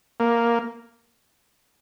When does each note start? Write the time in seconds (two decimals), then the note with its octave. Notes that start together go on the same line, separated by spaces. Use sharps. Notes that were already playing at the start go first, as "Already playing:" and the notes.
0.20 A#3